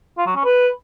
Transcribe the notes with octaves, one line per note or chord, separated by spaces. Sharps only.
F4
F#3
C#4
B4